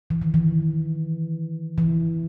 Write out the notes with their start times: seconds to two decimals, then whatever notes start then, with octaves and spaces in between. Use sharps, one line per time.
0.10 E3
0.22 D#3
0.34 E3
1.78 E3